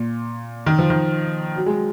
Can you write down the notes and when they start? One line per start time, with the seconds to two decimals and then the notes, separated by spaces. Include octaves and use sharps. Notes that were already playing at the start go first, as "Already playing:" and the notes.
Already playing: A#2
0.66 D#3
0.79 F3
0.90 D#3
1.56 F#3
1.66 G#3